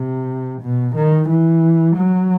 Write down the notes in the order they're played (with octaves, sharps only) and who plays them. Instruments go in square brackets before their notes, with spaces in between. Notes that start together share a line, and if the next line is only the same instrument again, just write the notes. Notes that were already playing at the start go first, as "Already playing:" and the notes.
Already playing: [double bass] C3
B2
D#3
E3
F#3